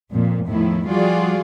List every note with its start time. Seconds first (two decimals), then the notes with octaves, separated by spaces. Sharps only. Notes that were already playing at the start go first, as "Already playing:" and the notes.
0.11 F2 A#2
0.47 E2 A2 D#3 F3 E4
0.90 F3 G3 F4 F#4 G#4 D5